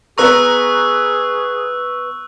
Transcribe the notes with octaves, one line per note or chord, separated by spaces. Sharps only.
B3 G#4 A#5 C#6 E6 F#6